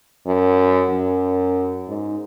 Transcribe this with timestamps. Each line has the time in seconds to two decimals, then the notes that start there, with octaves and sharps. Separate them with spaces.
0.26 F#2
0.91 F#2
1.88 G#2